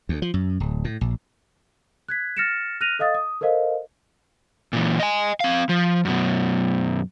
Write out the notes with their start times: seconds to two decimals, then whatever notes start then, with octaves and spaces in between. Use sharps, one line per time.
0.09 D2
0.22 F3
0.34 F#2
0.60 D1
0.85 A2
1.01 A#1
2.09 F#6 G#6 B6
2.37 F6 A6 A#6 C#7 D7 E7
2.81 F6 F#6 A#6 D#7 F7
2.99 A4 D#5 F5 D#6 A6
3.15 D#6
3.41 A4 A#4 C5 D#5 F5
4.73 A#2 E3
4.99 D#5 G#5
5.40 C4 F5
5.69 F3
6.05 F#2 B2